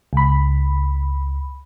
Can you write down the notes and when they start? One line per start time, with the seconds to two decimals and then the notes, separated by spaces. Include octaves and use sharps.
0.13 C#2 B5